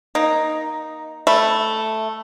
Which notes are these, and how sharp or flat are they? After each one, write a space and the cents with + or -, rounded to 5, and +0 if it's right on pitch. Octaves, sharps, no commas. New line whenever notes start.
A#3 +20 D#4 +0
A3 +0 E5 +5 B5 +0